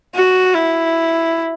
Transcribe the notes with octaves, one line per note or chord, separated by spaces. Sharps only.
F#4
E4